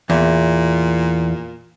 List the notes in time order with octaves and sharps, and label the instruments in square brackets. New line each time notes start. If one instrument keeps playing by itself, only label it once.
[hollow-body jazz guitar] E2 [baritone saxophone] A#2